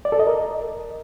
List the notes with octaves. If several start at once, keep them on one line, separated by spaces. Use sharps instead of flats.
D5
A4
D#5
A#4